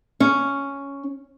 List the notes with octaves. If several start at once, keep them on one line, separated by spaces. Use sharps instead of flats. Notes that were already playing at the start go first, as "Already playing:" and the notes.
C#4